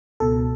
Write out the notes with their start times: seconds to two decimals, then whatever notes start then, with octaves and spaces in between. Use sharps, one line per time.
0.20 C#2 B2 A4